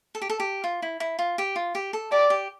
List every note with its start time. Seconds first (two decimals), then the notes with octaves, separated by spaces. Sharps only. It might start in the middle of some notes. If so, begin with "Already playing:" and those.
0.15 A4
0.22 G4
0.30 A4
0.40 G4
0.64 F4
0.82 E4
1.00 E4
1.19 F4
1.38 G4
1.56 F4
1.75 G4
1.93 A4
2.11 G4 D5
2.30 G4